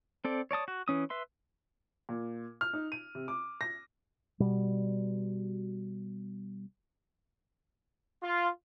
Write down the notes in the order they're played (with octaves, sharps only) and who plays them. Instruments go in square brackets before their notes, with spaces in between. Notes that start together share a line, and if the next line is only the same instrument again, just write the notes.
[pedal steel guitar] C4 A4 D5
C#5 D5 A5 D#6
F#4
E3 C#4 D#6
B4 E5 C6
[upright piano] A#2
F6
D#4
D#7
C3
D6
A#6
[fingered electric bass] B2 G3
[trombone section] F4